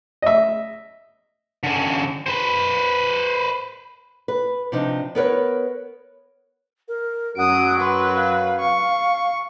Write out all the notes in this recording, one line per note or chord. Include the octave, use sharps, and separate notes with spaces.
D#5 E5
D3 C#4
B4 C5
B4
C3 F3 D4 D#4
B3 A#4 B4 C#5
A#4
F#2 F#3 F#5 D#6 D7
B4 C6
F5
C#6